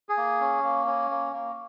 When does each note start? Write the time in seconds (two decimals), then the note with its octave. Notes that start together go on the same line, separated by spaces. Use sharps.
0.09 G#4
0.17 A#3
0.41 C#4
0.63 A#3
0.86 C#4
1.10 A#3
1.33 A#3